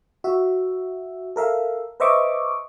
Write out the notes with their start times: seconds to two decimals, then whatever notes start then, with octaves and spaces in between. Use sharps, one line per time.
0.24 F#4 E5
1.36 A4 A#4 E5 F5
2.00 B4 C5 D#5 E5 C#6 D6